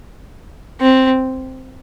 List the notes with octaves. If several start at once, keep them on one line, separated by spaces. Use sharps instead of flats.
C4